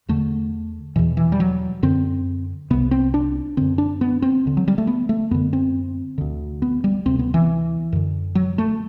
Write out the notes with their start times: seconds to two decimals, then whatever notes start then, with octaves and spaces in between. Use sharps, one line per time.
0.09 E2 D3 A3
0.96 E2 B2 E3
1.17 E3
1.32 G3
1.40 F#3
1.83 F#2 D3 C4
2.70 C2 C3 B3
2.91 C4
3.14 D4
3.57 F#2 D3 C4
3.78 D4
4.01 B3
4.22 C4
4.45 D2 D3
4.57 F#3
4.68 G3
4.78 A3
4.87 B3
5.09 A3
5.31 F#2 D3 B3
5.53 C4
6.18 D2 D3
6.62 B3
6.84 G3
7.05 D2 C3 C4
7.19 B3
7.34 E3
7.92 F#2 D3
8.35 F#3
8.58 A3